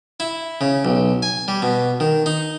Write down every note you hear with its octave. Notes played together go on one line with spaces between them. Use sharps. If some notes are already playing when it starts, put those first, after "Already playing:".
E4
C#3
B1
G#5
G3
B2
D#3
D#4